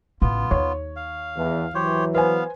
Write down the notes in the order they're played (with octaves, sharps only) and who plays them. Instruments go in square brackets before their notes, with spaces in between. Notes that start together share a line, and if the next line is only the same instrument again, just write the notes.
[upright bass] A1 C#3 [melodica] B3 F4
[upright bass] D#2 [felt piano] C#5
[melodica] F5
[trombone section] E2
[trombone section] E3 F#3 [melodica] G4 C5 C#5
[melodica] B3 F5 [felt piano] B4 C5 G#5